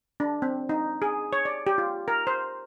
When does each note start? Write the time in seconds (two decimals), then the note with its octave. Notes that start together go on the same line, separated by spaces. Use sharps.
0.20 D4
0.42 C4
0.69 D#4
1.02 G#4
1.33 C#5
1.45 D5
1.67 G4
1.78 F4
2.08 A#4
2.27 C5